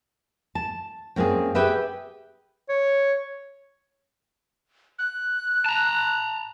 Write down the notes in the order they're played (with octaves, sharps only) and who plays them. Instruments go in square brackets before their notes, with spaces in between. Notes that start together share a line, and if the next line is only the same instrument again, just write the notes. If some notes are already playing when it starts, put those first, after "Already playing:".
[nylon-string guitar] A5
F#2 A#3 C4 F#4 G#4
G4 G#4 B4 E5 F#5
[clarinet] C#5
[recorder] F#6
[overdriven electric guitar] A5 A#5